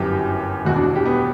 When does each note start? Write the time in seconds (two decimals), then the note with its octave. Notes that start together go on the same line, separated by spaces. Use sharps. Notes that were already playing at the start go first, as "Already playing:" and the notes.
Already playing: G1 F#2 E3 G4
0.65 E1 E2 B2 F#4
0.76 D4
0.96 G4
1.06 B3